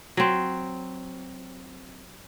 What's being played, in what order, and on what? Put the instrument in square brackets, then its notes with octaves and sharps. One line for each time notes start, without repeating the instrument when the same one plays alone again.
[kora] F#3 C4